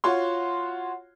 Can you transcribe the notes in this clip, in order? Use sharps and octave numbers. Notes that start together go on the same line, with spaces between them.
F4 F#4 C#5 C6